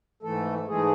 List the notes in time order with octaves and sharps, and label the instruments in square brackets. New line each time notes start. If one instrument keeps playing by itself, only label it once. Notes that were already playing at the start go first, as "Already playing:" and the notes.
[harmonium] G#2 E3 A3 A4
G#2 E3 G#3 A3 G#4